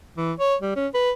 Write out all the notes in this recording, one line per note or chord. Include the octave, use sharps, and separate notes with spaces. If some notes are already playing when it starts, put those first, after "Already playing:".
E3
C#5
G3
C#4
B4